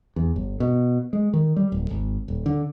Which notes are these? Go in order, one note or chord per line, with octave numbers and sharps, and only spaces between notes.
E2
G1
B2
G#3
D#3
G3
D1
G#1
D#1
D3